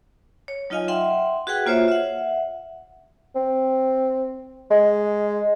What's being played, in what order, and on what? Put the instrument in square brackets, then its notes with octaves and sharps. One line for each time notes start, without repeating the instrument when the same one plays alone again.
[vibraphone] C#5
F#3 D#4 F4 D#5 F5 G#5
E5 F#5 G5 C6
F#4 G#4 B4 F#5 G5
A#3 F4 C5 C#5 E5
E5 F#5
[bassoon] C4
G#3